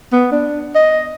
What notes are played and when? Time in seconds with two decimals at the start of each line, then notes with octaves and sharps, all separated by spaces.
0.12 B3
0.32 D4
0.75 D#5